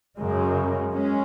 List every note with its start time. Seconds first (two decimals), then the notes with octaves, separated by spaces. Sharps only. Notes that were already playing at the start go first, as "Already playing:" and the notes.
0.17 F#2 C#3 G#3
0.93 G#3 C#4